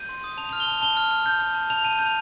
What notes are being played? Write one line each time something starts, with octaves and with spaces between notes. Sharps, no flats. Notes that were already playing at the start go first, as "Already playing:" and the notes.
Already playing: G6 D#7
C6
D#6
A5 F7
F6 F7
G7
A5 F7
A5 G7
F6
F6
G6
G6
A5
A5 F7
A5 D#7
G6 F7